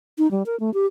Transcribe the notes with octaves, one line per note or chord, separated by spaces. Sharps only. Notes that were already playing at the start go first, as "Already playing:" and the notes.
D#4
G3
A#4
A3
G4